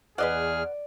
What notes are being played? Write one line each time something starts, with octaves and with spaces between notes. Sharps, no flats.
E2 G#4 B4 D5 D#5 F#5 F6